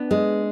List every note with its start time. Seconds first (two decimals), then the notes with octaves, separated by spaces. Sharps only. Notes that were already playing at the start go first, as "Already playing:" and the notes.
Already playing: B3 D4
0.11 G#3